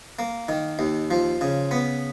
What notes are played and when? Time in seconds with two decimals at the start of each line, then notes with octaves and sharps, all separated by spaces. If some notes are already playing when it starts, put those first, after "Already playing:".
0.19 A#3
0.49 D#3
0.79 D#2
1.11 F3
1.41 C#3
1.71 B3